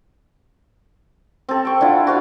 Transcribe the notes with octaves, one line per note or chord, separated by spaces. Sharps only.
C4 A4
G5 C#6
D3 E4 F4
F#4 C5 F5